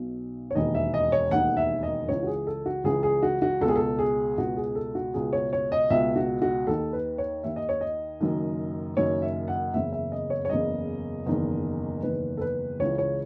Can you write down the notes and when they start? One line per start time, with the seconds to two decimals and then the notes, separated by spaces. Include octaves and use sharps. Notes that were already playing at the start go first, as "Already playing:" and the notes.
Already playing: B1 B2
0.51 C#5
0.55 E1 D#2 D#3 D#5
0.75 E5
0.94 D#5
1.12 C#5
1.31 E1 D#2 D#3 F#5
1.57 E5
1.83 D#5
2.08 C#2 C#3 E3 C#5
2.23 F#4
2.27 G#4
2.47 A4
2.66 F#4
2.84 C#2 C#3 E3 G#4
3.03 G#4
3.23 F#4
3.42 F#4
3.61 C#2 A4
3.65 B2 G#4
3.76 A4
3.99 G#4
4.38 C#2 B2 F#4
4.56 G#4
4.75 A4
4.95 F#4
5.14 C#2 B2 G#4
5.33 C#5
5.53 C#5
5.72 D#5
5.90 C#2 B2 E5
6.16 F#4
6.42 F#4
6.67 D#2 D#3 A4
6.93 B4
7.18 C#5
7.44 D#2 D#3 E5
7.56 D#5
7.69 C#5
7.81 D#5
8.21 F#1 F#2 D#3
8.96 F#1 F#2 D#3 C#5
9.22 E5
9.48 F#5
9.73 F#1 E2 C#3 E5
9.92 E5
10.12 D#5
10.30 C#5
10.45 C#5
10.49 F#1 E2 C#3 D#5
11.26 F#1 E2 D#3
12.03 F#1 E2 D#3 B4
12.37 A4
12.41 B4
12.79 C#2 C#3 E3 C#5
12.98 C#5